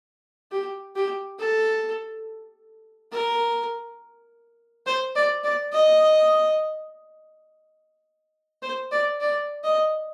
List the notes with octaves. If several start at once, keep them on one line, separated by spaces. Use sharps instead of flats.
G4
G4
A4
A#4
C5
D5
D5
D#5
C5
D5
D5
D#5